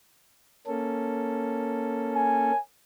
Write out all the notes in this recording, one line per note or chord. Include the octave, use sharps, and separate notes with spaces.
A#3 C#4 A4
G#5